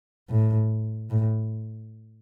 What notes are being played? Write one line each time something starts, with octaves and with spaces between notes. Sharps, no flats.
A2
A2